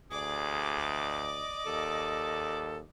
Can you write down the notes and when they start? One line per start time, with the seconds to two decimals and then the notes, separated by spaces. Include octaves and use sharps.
0.11 D2 G#4 D5 D6
0.82 D#5
1.66 D#2 A4